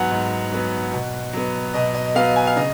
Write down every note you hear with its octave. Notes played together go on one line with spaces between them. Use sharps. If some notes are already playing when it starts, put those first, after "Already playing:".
Already playing: G#2 F#3 B3 F#5 G#5
G#2
F#3 B3
B2
F#3 B3
B2 D#5
D#5
F#3 B3 F5
G#5
F5
C#3 D#5